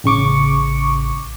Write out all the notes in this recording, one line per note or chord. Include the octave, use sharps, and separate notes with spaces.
A1 C#3 C#6 D6